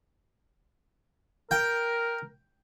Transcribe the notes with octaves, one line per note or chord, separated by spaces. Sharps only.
A#4 G5